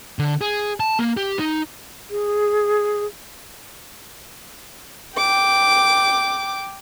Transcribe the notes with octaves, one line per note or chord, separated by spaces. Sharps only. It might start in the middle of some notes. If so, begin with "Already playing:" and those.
D3
G#4
A5
A#3
G4
D#4
G#4
G5 D6